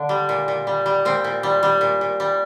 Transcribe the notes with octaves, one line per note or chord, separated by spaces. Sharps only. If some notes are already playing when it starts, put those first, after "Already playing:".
Already playing: D3 D4
G3
A#2
A#2
G3
G3
A#2 C4
A#2
G3
G3
A#2
A#2
G3